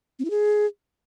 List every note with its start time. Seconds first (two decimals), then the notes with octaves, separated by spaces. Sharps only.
0.19 C4
0.25 E4
0.30 G#4